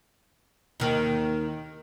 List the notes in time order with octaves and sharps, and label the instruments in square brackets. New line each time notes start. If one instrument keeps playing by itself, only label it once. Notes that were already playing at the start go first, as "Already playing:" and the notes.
[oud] D#2 D#3